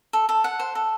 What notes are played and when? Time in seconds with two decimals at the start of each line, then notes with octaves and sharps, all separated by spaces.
0.13 A4
0.29 A4
0.44 F#5
0.59 C5
0.75 A4